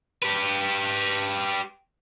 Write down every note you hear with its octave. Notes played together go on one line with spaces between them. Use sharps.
G4 B4